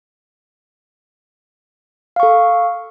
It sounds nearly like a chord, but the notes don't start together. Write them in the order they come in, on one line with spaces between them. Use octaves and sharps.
F5 C#6 A4